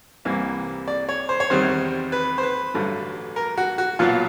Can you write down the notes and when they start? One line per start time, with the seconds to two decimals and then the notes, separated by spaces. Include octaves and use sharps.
0.25 C2 C3 E3 G3 A#3
0.88 D5
1.09 C#5
1.29 C5
1.40 C#5
1.50 E2 C3 D#3 G3 C4 C5
2.12 B4
2.38 C5
2.43 B4
2.74 A1 G2 D3 F#3 A3
3.36 A#4
3.58 F#4
3.78 F#4
3.99 B1 A#2 F#3 B3 F4